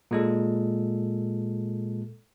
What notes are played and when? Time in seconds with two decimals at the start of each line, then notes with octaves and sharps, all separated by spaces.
0.11 A#2 G#3 A4